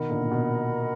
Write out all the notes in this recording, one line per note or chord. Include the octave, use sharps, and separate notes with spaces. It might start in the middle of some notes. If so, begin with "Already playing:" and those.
Already playing: B2 D#3 A#4 D#5 F#5 B5
A#2 D3
A#2
B2